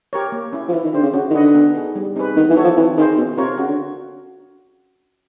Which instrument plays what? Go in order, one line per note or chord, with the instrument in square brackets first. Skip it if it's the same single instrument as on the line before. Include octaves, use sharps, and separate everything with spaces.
[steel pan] G4 A#4 C#5
A#3
C#4 E4
[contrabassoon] F3
[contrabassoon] E3 [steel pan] E4
[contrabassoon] D#3
[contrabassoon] D3 [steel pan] G4 C5
[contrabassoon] C#3
[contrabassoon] C#3 [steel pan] F#4
[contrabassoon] D#3
[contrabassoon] D3 [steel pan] B4 D#5 F#5
[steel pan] B3
D#4 G#4
G3
C4 D#4 G#4 B4
[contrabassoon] D#3 [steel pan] B3
[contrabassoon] E3
[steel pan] D#4 F#4 A4 C#5
[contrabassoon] F3
[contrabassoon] E3 [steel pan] C4
[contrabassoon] D#3 [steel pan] E4 G#4 C5
[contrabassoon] B2 [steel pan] C#4
[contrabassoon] C3 [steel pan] F4 A#4 C#5
[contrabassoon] C#3 [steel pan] F#4
[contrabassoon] D3